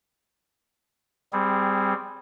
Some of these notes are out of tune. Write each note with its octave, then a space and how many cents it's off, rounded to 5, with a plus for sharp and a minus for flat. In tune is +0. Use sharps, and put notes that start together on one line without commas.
G3 +5 C4 -15 G#4 -10